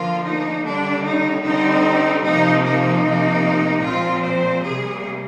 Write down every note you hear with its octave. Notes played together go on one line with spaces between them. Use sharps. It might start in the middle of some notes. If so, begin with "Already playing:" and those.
Already playing: D3 F3 A#3 F4
D#4
D3 G3 A#3 D4
D#4
D3 G3 C4 D#4
C3 F3 A#3 D#4
D#4
C3 F3 A#3
A#2 F3 G#3 C4 F4
C5
C3 G3 A#3 G#4